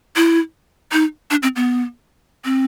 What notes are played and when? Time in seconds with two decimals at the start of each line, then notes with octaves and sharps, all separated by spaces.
0.16 E4
0.92 D#4
1.31 D4
1.43 C4
1.56 B3
2.45 C4